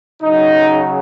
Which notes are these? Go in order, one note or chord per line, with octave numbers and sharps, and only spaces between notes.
C#3 F#3 D#4